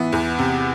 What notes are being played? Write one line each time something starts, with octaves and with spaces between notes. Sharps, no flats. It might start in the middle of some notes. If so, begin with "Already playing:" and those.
Already playing: E3 B3
E2
C3